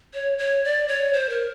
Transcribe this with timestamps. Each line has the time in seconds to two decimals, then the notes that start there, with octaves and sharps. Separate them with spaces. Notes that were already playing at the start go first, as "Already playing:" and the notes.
0.14 C#5
0.38 C#5
0.64 D5
0.88 C#5
1.13 C5
1.29 A#4